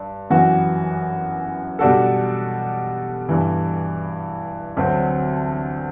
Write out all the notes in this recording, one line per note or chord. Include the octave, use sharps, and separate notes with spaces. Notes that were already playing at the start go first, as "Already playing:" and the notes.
Already playing: G2
F#2 E3 B3 F#4
B2 G3 D4 F#4 A4
G2 E3 B3
D2 D3 F#3 C4 F#4